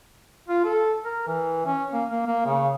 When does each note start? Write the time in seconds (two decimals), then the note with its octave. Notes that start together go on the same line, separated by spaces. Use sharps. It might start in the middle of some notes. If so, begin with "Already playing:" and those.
0.48 F4
0.64 A4
1.05 A#4
1.27 E3
1.66 C#4
1.93 A#3
2.11 A#3
2.27 A#3
2.46 C#3